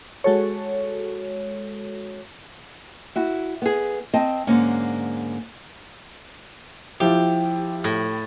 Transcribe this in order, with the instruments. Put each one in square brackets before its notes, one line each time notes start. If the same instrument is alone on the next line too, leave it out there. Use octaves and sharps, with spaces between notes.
[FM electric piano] G#3 F#4 A4 C#5
[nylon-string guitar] E4 F#4
B3 G#4
C4 D#5 A5
G#2 D3 A#3 C#4
[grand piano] F3 E4 [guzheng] G4
[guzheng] A2